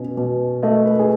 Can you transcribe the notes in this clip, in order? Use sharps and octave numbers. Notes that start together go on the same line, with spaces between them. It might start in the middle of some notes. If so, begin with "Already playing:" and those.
Already playing: B2 C#4
B2
A3 D#5
B4
G#4